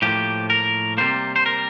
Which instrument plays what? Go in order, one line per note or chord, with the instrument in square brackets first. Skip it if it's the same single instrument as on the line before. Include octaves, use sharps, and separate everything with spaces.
[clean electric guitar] A2 F3 A#3 G4
A#4
C3 G3 A#3 C5
C5
A#4